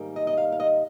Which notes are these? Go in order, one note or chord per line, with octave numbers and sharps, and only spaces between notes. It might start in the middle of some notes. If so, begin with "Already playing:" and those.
Already playing: G#2 D#3 G3 A#3
D#5
D#5
F5
F5
D#5